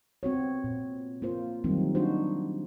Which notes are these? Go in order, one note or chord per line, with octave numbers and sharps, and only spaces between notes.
B3 C4 F#4 C#5
A#2
A#3 F4 C5
D#3 F#3 G3 A#3 C4 D#4
D4 D#4 F#4 C5